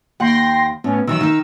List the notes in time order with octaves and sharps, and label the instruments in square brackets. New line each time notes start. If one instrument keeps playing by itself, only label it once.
[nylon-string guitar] D#2 F#5 [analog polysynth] G5 C6 A#6
[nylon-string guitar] A2 [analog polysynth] B3 C#4
[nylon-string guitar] D#3 E3 F#3 [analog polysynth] E6
[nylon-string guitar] D#3 D#4